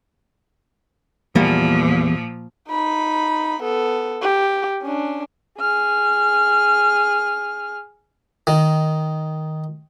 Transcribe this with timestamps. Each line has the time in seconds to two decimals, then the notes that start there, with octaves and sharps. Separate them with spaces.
1.35 E2 A#2 F3 G3 A#3
2.70 D#4 B5
3.62 B3 A4
4.22 G4
4.82 C#4 D4
5.59 G#4 F6
8.47 D#3